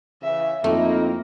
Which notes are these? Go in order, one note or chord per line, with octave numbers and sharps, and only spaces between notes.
C#3 E3 E5
F2 A3 A#3 C4 D#4 E4